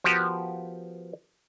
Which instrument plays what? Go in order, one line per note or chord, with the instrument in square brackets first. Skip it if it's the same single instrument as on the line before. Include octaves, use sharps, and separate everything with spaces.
[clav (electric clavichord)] F3 B3 F#4 G4 A#4 B4